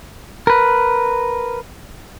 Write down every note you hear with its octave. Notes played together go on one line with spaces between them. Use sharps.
A#4 B4